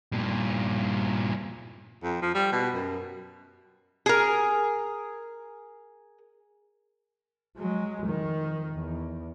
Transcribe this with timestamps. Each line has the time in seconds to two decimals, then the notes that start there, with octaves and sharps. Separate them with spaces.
0.12 G2 A#2
2.03 F2
2.22 F3
2.35 G3
2.52 B2
2.75 F#2
4.06 G#4 A#4
7.58 F#3 G#3
8.02 F2 D#3
8.73 E2